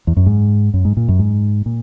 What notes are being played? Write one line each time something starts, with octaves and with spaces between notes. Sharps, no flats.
E2
F#2
G#2
F#2
G#2
A#2
F#2
G#2
A#2